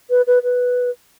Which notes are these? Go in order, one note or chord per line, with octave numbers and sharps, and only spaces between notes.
B4
B4
B4